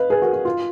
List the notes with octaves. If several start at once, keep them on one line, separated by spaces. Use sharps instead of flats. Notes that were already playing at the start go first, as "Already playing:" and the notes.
Already playing: B4 D#5 F5
G#4 B4
F#4 A#4
F#4
F4